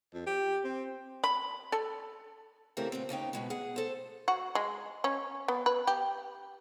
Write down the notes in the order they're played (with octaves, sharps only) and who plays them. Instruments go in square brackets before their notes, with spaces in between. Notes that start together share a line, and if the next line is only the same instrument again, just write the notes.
[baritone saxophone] F2
G4
C4
[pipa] B5
A4
[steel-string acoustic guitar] C#3 E3 A3 C4 G4 A#4
A#2 B3 C4
D#2 C#3 D#4 G5
B2 G#3 B3
G#4 F#5
A4 C5
[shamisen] F#4
G#3
C#4
B3
B4
G4